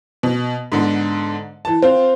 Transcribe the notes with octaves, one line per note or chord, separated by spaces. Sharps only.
B2
G#2 D3 B3
E3 A5
C4 F4 C5